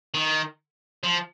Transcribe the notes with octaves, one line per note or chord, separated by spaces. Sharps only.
D#3
F3